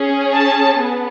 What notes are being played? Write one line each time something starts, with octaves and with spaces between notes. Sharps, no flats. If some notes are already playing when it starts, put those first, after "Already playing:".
Already playing: C#4 G#4
A5
B3